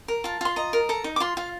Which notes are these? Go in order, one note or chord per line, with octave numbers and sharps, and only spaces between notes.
A#4
F4 A5
F4 C6
D#5 A#5
A#4
A4 A#5
D#4
D6
F4 C6
F4 F5